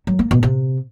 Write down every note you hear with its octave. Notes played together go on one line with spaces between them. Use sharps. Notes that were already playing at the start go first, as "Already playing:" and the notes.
F#3
A#3
B2
C3